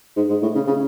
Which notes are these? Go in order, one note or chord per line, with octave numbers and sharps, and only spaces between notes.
G#2
G#2
A2
C#3
C#3